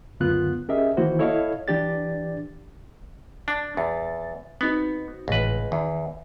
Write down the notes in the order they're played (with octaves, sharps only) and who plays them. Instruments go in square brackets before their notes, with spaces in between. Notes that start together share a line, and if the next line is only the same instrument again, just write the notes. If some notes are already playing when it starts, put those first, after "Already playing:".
[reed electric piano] C#2 F#2 D3 B3 F4 F#6
C#4 G4 G#4 A#4 D#5 E5
D#3 E3 A#3 E4 F#4 C5
E4 A4 C#5 D#5 F5
E3 D4 G4 D5 A6
[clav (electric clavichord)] D4 [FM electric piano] A5
[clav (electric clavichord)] E2 [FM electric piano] A6
[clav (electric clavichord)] B3 [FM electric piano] C4 D#4 F#4
[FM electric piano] G#1 A2 E3 [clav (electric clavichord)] C#2 B4
[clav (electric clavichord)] E2 [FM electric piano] D#3